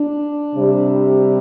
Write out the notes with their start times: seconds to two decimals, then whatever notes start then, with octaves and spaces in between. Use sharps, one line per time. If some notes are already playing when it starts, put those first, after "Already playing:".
Already playing: D4
0.54 C3 G3